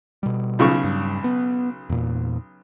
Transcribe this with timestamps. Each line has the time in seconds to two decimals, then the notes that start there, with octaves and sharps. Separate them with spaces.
0.23 B2 G3
0.59 B1 C#3 C#6
0.84 G2
1.24 B3
1.90 E2 A#2